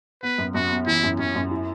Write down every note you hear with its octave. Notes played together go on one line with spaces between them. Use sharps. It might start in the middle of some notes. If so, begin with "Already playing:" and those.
B3 B4
F#2
F#2 F#4
B3
E3 E4
F#2
F#2 C#4
F#2
E4